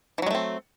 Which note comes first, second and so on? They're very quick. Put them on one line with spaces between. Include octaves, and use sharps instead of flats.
E3 F#3 G#3 A3 C4